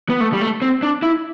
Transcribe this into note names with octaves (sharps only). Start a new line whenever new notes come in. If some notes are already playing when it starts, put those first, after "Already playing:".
B3
A3
G3
A3
C4
D4
E4